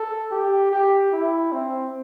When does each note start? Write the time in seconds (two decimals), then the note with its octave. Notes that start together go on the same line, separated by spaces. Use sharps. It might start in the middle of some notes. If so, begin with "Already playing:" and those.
Already playing: A4
0.31 G4
0.71 G4
1.12 E4
1.52 C4